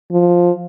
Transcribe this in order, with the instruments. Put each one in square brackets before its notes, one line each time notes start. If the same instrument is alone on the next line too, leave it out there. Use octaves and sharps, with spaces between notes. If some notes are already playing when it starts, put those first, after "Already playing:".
[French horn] F3